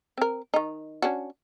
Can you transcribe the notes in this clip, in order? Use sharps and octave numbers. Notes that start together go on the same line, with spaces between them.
C4 A#4
D#3 D#4
C#4 D4 F#4